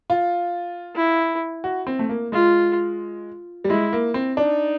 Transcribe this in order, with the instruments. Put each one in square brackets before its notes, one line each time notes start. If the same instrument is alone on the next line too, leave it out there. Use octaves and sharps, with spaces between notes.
[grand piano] F4
[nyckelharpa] E4
[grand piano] F#4
C4
A3
A#3
[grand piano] G#3 [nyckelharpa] F4
[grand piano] G3
[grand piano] G#3 [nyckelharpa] E4
[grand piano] A#3
C4
[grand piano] D4 [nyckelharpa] D#4